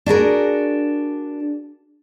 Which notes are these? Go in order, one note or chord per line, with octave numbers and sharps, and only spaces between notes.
D4 F#4 G#4 A#4